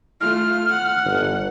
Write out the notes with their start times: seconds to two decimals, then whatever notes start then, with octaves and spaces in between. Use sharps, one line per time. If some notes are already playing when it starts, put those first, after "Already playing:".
0.21 A3 F4 F6
0.70 F#5
1.06 G1